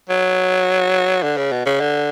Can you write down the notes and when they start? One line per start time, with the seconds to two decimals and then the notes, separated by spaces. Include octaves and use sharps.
0.09 F#3
1.23 D3
1.37 C#3
1.52 B2
1.66 C#3
1.80 D3